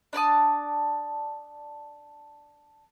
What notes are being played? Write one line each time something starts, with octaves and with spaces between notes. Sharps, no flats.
D4 D5 A5 D#6